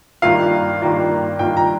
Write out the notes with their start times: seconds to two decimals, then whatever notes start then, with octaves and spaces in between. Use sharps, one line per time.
0.22 G2 D#3 A#3 F4 F5
0.82 G2 D#3 A#3 F4
1.39 G2 D#3 A#3 F4 G5
1.57 A#5